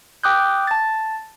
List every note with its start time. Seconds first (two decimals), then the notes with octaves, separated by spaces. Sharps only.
0.24 G5 D6 D#6 F#6 G6
0.67 A5 A6